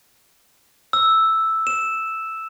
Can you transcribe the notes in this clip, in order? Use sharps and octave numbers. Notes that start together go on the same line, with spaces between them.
E6
E7